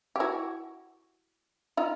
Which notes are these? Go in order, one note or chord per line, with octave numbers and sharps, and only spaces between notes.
G4
E4 F#4
D#4 F4